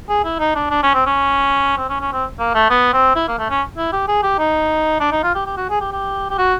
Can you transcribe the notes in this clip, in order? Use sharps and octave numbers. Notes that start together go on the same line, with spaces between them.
G#4
E4
D#4
D4
D4
C#4
C4
C#4
C4
C#4
C#4
C4
A#3
A3
B3
C4
E4
A#3
A3
C#4
E4
G4
G#4
G4
D#4
D4
D#4
F4
G4
G4
F#4
G#4
G4
G4
G4
F#4